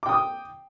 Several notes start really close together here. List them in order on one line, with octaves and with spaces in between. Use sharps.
D6 G5 D#6